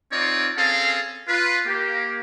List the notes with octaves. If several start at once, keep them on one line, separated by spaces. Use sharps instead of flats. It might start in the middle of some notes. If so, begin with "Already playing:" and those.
C4 D#4 F4 C#5 D5
C4 C#4 G#4 A4 F5 A5
F4 B4
A#3 G4